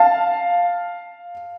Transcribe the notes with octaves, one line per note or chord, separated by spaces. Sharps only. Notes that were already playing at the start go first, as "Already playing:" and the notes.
Already playing: F5 A5